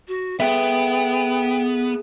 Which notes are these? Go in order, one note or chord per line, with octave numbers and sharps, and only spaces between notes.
F#4
B3 G#4 A4 E5 G5